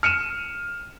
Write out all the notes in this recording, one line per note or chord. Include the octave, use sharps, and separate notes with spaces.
F6 C#7 D#7 E7